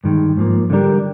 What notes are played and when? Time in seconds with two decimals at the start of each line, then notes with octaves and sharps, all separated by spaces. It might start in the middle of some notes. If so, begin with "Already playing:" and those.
0.04 G2 D#3 G#3
0.37 G#2 F3 A#3
0.70 D3 G3 D4 G4 A#4